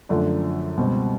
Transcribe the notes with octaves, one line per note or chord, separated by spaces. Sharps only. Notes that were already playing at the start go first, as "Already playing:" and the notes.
F#2 D3 F3 A3 D4
C#2 B2 G3 C4